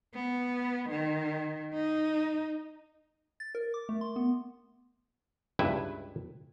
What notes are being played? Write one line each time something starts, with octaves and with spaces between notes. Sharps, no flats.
B3
D#3
D#4
A6
A#4
D6
A3
C6
B3
C#2 G2 E4 B4 E5